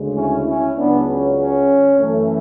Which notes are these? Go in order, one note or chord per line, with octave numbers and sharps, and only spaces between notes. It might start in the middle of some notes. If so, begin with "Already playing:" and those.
Already playing: D2 C#3 G#3
C#4 E4
C#4 E4
C#2 C#3 F#3 B3 D4
C#4
C#4
F#2 E3 A3